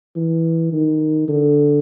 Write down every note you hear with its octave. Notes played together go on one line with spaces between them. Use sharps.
E3
D#3
D3